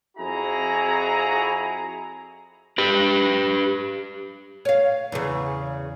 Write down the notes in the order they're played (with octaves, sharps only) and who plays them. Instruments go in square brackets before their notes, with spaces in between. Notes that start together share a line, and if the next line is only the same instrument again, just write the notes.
[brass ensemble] F2 E4 F#4 G#4 A#5
[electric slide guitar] G4 B4
[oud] C#5 F5
E2 C#3